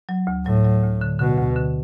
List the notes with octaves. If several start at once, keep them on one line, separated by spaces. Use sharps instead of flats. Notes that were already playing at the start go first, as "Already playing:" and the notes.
F#3
D2
A2 F#3
F#3
D2
D3
B2 D3
D2
D3